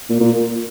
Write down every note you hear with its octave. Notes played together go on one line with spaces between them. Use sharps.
A#2
A#2